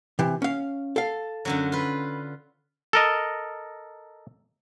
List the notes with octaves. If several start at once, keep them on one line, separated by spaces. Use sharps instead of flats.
C3 E3
C#4 F5
A4 F5
F#2 D3 F#3
F4 B4
A4 A#4 D#5